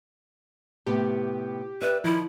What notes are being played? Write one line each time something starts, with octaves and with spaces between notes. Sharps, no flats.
A2 C3 B3 G4
B4 D5 E5
D#3 F3 E4